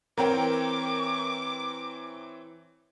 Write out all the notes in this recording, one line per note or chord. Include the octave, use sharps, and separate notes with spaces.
E3 C4 A#4 C#5 G5 D6